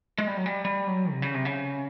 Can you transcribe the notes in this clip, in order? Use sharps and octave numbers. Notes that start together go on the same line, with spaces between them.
G#3
G3
F#3
G3
G3
F#3
C3
C#3
C3
C#3